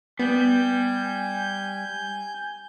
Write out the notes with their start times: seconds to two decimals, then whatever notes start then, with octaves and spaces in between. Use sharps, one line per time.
0.19 G3 B3 G#5 G6